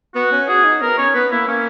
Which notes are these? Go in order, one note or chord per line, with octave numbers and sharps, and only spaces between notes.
B3 F#4
C#4
F#4 G#4
D#4
B3 A#4
C#4 C#5
B3 B4
A#3 E4
A#3 C#4